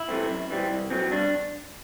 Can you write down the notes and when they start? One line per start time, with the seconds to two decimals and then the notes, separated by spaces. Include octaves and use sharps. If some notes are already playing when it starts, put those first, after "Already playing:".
Already playing: E4
0.08 C3 E3 A3 C4
0.29 F#2
0.50 E3 G3 C4
0.71 C2
0.90 B2 F#3 C4
1.11 G2 D4